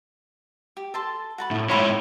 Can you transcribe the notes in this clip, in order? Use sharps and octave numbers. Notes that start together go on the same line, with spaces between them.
G4
A4 A5 C6
F#4 A5 B5
A2
G#2 E4 C#5 B5 C6